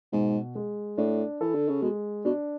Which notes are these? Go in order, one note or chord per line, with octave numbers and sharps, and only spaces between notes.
G#2 B2
G#3
A2 D4
E3 A4
D3
C#3
B2 G#3
B2 D4